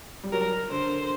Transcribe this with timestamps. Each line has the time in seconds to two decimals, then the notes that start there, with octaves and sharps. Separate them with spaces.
0.24 G3
0.32 F#3 A#4
0.71 D3 C5